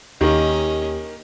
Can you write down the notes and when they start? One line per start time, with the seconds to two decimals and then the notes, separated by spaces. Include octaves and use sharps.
0.21 D#2 D#3 A#3 C#4 G4 D#5